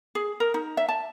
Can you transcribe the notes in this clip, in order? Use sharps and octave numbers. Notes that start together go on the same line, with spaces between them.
G#4
A#4
D#4
E5
A5